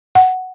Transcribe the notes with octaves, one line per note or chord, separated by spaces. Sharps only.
F#5